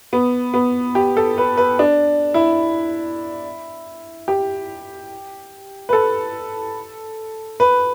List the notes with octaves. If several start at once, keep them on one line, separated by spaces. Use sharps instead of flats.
B3
B3
G4
A4
B4
B4
D4
E4
G4
B4
A4
B4